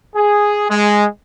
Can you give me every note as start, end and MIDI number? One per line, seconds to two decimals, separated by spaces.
0.14 0.66 68
0.69 1.05 56